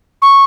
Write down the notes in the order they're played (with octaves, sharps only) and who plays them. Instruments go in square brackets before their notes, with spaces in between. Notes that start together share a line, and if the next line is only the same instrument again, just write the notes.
[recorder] C#6